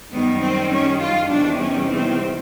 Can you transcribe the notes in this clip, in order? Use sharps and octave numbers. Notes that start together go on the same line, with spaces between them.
F#2 D#3 G3 B3
C4
C#4
F4
E2 C3 D#3 G3 D4
C#4
C4